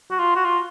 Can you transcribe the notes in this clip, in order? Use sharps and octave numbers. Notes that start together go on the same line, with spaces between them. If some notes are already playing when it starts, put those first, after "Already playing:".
F#4
F4
F#4
F4